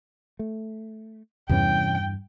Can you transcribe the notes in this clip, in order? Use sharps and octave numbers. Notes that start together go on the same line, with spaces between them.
A3
E2 G2 C3 E3 C#4 G5